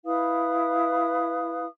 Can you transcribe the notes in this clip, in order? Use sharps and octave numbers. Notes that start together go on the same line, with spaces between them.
E4 B4 F5 D#6